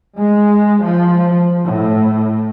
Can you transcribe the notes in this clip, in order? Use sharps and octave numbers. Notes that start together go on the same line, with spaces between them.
G#3
F3
A2